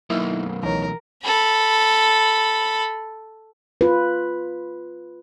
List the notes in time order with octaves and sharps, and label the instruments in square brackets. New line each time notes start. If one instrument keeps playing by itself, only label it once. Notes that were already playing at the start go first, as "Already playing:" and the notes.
[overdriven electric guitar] B1 F#2 [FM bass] A#3 [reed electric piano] D#4 E4
[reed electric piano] C#2 D#4 C#5 [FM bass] E3 [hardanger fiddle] A#4
[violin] A4 B5
[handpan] F4 B4